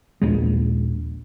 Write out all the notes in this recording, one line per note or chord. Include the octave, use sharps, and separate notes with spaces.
A#1 D#2 G#3